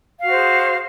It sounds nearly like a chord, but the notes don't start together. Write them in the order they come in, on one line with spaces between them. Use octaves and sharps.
F5 F#4 C5 G#4